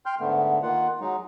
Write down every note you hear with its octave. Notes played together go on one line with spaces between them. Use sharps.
G5 C6 F6 G6
G#2 D3 A3 B3
D#3 A#3 F4 F#5
F#3 G#3 D#4